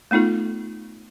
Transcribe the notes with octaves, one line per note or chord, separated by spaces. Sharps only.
A3 B3 D#4 F4 A4